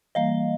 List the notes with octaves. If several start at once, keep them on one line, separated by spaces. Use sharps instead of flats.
E3 G3 A#3 D#5 F5